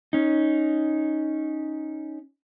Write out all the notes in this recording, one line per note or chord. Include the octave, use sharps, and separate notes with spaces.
C#4 D#4